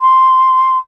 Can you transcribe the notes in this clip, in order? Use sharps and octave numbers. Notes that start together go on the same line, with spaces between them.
C6